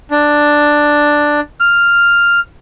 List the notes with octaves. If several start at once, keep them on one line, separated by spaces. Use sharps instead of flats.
D4
F6